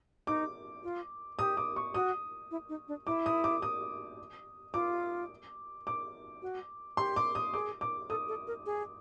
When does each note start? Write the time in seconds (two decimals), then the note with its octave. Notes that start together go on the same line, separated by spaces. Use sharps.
0.27 D#4 D6
0.84 F4
1.39 G4 D#6
1.57 D6
1.76 C#6
1.94 F#4 D#6
2.51 E4
2.69 D#4
2.88 D4
3.07 E4 D6
3.26 D#6
3.44 D6
3.62 D#6
4.74 F4 D6
5.87 D6
6.42 F#4
6.97 G4 C6
7.16 D6
7.35 D#6
7.54 G#4 D6
7.81 D6
8.09 A4 D#6
8.28 A4
8.47 A#4
8.66 G#4